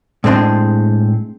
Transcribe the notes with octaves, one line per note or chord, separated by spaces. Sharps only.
A2 G#3 C4 D4 C6